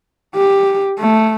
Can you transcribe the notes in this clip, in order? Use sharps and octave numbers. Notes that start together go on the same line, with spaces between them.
G4
A3